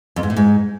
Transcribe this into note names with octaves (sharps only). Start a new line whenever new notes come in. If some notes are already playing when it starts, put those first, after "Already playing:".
F2
G#2
A2
G#2